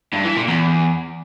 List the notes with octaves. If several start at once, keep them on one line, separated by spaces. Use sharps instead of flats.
G2
E3
A#2
E2